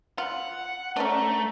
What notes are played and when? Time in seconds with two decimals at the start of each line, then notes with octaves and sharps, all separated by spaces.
0.18 F4 F#5
0.96 A3 C#4 D4 A#5